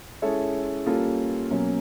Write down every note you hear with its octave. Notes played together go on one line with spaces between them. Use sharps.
G#3 C#4 E4 A4 C#5
G3 A#3 C#4 F4 A4
B2 F#3 A#3 C#4